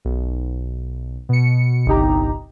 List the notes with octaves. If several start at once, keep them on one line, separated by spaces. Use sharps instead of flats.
B1
B2 C#7
G1 C2 D#4 G4 A#5